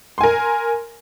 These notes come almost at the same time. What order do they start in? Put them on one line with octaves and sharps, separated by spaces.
C6 G#5 A#4